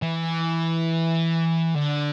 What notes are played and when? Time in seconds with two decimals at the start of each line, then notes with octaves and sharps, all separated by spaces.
0.02 E3
1.75 D3